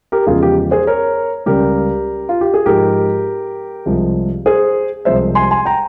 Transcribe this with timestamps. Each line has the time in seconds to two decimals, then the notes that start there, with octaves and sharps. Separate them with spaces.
0.12 G4 A#4
0.27 E2 C#3 F3 G#3 F4 G#4
0.43 G4
0.71 G#4 C5
0.87 A#4 C#5
1.46 C#2 C#3 G3 G4 A#4
2.29 F4
2.41 G4
2.54 G#4
2.66 G#2 F3 G#3 G4 A#4
3.86 C2 C3 F3 G#3
4.46 G#4 C5
5.05 C2 C3 F3 G#3 C5 E5
5.35 G#5 C6
5.51 G#5 C6
5.66 G5 A#5